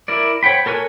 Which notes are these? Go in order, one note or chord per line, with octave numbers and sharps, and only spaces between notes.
E4 A#4 D5
C5 C#5 F#5 G5 B5
A4 A#4 C#5 G#5 F#6